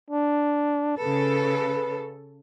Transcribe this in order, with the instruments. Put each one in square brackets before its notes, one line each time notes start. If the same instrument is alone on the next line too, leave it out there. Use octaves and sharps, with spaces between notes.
[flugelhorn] D4
[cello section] C#3 A4 [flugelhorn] B4